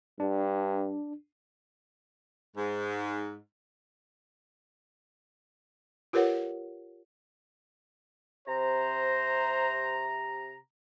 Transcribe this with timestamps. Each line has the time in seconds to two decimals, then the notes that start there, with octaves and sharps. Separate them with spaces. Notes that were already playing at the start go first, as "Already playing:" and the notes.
0.20 G2 D4
2.56 G#2
6.13 F4 G4 A#4 B4 C#5 F#5
8.48 C3 C5 A#5